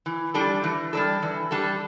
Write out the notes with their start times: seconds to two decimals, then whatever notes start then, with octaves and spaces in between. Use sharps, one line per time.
0.06 E3
0.34 G3 D4 A4
0.64 E3
0.93 G3 D4 A4
1.22 E3
1.51 G3 D4 A4